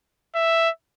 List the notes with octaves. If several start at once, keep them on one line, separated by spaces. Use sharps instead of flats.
E5